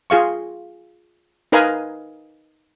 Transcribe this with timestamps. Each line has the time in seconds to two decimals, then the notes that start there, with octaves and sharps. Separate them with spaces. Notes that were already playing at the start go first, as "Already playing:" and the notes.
0.10 F4 G#4 F5 C#6
1.52 D#4 A#4 B4 D#5 F5 G#5